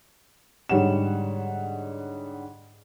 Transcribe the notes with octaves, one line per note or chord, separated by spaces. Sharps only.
G#2 D3 G3 C#5 F#5 E7